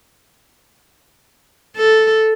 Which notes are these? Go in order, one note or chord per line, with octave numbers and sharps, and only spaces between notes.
A4